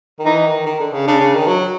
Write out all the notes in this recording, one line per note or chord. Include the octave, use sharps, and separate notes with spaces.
D#3
E3 D#4
D#3
D#3
D3
C#3
C#3 D4
C#3
D#3
F#3